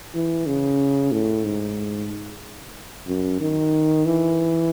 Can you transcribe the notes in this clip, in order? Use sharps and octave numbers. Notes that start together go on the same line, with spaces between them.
E3
C#3
A2
G#2
F#2
D#3
E3